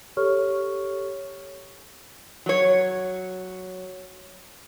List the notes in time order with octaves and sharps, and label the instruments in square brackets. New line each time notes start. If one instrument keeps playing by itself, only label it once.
[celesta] G4 A4 C#5 C#6 F6
[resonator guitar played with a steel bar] F#3 C#5